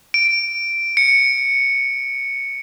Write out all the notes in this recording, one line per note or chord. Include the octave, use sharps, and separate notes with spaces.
D7
C#7